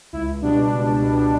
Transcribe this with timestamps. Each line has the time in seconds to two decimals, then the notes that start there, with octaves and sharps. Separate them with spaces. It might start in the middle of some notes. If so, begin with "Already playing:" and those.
0.13 C#2 E4
0.42 B2 G3 D4
0.72 C#2
1.02 B2 G3